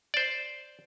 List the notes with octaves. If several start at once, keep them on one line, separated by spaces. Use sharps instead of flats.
C5 D5